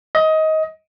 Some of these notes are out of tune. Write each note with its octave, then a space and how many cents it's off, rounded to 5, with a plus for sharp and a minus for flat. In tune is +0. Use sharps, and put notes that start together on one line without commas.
D#5 +20